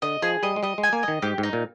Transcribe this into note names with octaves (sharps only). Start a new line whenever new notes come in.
D3 D#5
F3 G#4
G3 D#5
G#3
G3 D#5
G#3
G#5
A#3
D#5
D#3
G#2 G4
G#2
D#4
A#2